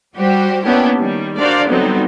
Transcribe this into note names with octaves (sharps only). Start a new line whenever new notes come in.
G3 F#4 G4 C5
A#3 B3 C#4 D4 E4 G4
D#3 G3
D4 F#4 A#4 C5 D5 F5
D3 F#3 G3 B3 C4 D#4